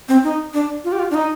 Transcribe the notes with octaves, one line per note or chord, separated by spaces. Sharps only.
C4
D#4
D4
F4
G4
F4
D4
D#4